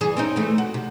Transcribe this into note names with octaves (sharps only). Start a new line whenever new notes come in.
G2 E3 G#4
C4 C#4 D#4
E3 A3
F#4
C3